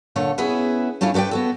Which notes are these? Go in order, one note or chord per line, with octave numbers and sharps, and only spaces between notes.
A#2 D3 A3 C#5
B3 C#4 E4 G#4 B4
A3 C#4 D4 E4 F4
A3 B3 B4 D5 G5
B3 F#4 A4